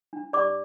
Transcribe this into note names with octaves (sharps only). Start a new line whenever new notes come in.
D4
G4 D5 D6